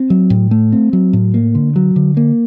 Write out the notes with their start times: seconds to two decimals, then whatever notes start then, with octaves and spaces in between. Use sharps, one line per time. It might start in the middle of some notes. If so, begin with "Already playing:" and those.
Already playing: C4
0.10 F#3
0.30 A2
0.51 A3
0.72 C4
0.93 F#3
1.13 A2
1.34 A#3
1.55 D3
1.76 F#3
1.96 D3
2.17 A#3